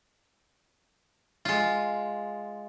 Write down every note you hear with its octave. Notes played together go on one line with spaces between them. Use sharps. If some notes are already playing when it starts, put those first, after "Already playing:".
G#3 F4